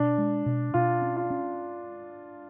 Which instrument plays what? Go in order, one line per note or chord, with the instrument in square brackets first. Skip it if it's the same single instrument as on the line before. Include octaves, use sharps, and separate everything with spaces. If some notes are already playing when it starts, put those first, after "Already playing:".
Already playing: [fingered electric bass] B2 [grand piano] D4
[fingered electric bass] G#3
B2
[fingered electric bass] B2 [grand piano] F4
[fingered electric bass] C#4
[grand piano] F4
[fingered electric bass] C#4